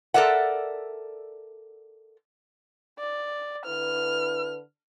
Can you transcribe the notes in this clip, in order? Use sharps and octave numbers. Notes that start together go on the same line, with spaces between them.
A4 A#4 D5 E5 F#5
D5
D3 E4 B4 F6